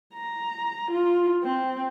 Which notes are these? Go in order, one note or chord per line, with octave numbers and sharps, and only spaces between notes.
A#5
F4
C4